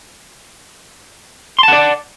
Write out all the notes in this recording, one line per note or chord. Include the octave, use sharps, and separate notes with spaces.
D5 F#5 A5 C6